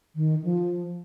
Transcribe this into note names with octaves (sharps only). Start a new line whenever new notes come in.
D#3
F3